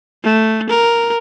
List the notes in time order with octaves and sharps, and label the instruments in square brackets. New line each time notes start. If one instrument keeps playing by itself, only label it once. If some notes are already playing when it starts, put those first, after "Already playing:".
[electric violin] A3
A#4